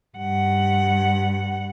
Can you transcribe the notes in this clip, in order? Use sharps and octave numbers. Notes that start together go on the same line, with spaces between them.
G2 F#5